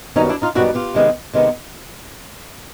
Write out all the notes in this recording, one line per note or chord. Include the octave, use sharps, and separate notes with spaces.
F#2 D#3 G3 B3 C#4 D#4
D4 E4
D#4 F4
F#2 D#3 G3 B3 E4 F#4
F4 G4
C3 D#3 G#3 B3
C3 D#3 G#3 B3